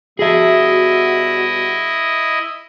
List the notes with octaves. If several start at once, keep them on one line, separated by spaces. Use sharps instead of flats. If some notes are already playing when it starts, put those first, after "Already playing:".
B2 G3 E4 F#4 G#4 D#5 E5